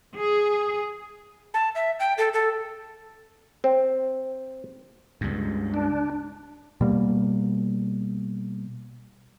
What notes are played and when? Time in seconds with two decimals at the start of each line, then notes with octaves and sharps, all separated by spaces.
0.15 G#4
1.54 A5
1.75 E5
2.00 G5
2.18 A4
2.33 A4
3.64 C4
5.21 C#2 G2
5.74 D4
6.81 B2 G3 A#3